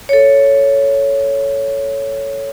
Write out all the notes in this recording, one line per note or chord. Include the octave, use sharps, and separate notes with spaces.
A4 C#5